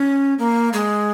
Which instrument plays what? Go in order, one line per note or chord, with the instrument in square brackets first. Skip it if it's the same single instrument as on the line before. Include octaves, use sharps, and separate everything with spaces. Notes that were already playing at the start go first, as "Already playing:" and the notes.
Already playing: [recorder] C#4
A#3
G#3